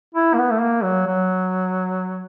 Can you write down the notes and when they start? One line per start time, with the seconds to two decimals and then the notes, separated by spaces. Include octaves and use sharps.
0.15 E4
0.34 A#3
0.38 B3
0.51 A3
0.61 A#3
0.83 F#3
1.07 F#3